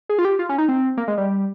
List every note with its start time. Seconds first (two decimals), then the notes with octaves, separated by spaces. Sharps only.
0.09 G#4
0.19 F4
0.25 G4
0.39 F4
0.49 C#4
0.58 D#4
0.68 C4
0.97 A#3
1.08 G#3
1.17 G3